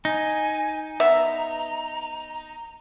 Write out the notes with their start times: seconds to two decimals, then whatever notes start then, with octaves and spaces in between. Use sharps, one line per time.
0.05 D#4 G#5
1.00 B3 E5 A#5